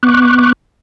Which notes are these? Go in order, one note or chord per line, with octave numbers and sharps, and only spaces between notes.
B3 C#6 D6 F#6